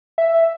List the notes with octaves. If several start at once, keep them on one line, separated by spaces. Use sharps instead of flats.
E5